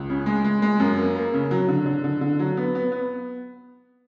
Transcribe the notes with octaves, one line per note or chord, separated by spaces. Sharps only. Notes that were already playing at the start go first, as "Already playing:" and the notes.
Already playing: C#2
C#3
G#3
G#3
G#3
F#2
A#3
A#3
C#3
F#3
D3
D3
D3
D3
F#3
B3
B3
B3